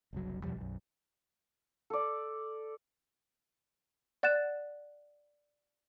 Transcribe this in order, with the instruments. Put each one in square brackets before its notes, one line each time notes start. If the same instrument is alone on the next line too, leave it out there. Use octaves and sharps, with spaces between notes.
[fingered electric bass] F#1 C2 F#3
E2 B2 F3 G3
B1 F#2
[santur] A4 D5
[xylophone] D5 F#5 F#6 A6 E7